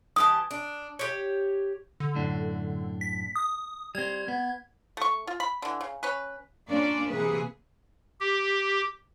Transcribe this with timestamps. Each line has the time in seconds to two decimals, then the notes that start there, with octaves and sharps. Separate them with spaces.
0.16 E3 G4 A5 D#6
0.51 D4
0.99 G4 C#5
2.00 D3
2.15 F#2 A2 D4
3.01 B6
3.36 D#6
3.95 G3 C4 G#6
4.28 B3
4.97 A3 C#6
5.27 F4
5.40 B5
5.62 D3 E3
5.81 C#3
6.03 C#4 B4
6.68 A#3 C#4 D4 F4 D5
7.10 C3 E3 A#3 G#4 B4
8.20 G4